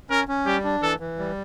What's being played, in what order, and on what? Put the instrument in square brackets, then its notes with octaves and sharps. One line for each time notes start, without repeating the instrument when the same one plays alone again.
[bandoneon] C#4 [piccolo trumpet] A#4
[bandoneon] C#4
[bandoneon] G3 [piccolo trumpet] G4
[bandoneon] D4
[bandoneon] E3 [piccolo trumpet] A4
[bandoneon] E3
G3